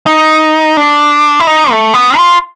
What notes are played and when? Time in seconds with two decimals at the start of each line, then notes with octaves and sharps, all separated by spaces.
0.06 D#4
0.77 D4
1.40 E4
1.47 D#4
1.71 A3
1.94 B3
2.17 F4